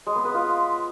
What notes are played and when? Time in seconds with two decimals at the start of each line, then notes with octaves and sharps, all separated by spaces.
0.07 G#3
0.16 B3
0.25 B4
0.34 F4